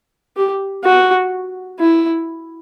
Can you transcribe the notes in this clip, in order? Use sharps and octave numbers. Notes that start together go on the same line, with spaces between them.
G4
F#4
E4